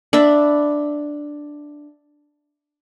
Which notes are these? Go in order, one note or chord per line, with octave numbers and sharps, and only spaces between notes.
D4 E5 B5